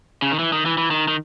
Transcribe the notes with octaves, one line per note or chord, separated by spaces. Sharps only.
C#3
D#3
E3
D#3
E3
E3
D#3
D#3